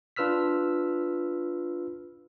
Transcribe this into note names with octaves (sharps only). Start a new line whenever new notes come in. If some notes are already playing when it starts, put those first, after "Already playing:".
D4 F4 B4 E6 F6 B6